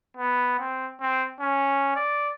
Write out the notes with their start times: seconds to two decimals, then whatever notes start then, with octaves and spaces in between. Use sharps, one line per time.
0.17 B3
0.59 C4
1.01 C4
1.40 C#4
1.95 D5